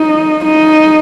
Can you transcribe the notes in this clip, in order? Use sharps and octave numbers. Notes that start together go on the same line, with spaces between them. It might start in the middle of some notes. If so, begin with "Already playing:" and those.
Already playing: D#4
D#4